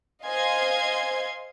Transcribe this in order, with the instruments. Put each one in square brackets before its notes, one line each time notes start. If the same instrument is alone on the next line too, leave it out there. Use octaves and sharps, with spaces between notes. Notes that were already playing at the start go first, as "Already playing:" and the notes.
[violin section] C5 D#5 F5 G#5 C6 G#6